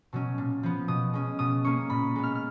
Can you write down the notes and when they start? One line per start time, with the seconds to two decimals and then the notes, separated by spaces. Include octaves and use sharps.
0.13 B2 F#3 C#4
0.38 A#2
0.63 F3 B3
0.88 B2 D#6
1.14 G#3 C#4
1.39 B2 D#6
1.64 A#3 C#4 C#6
1.90 A#2 B5
2.16 G#3 B3
2.23 F6
2.35 F6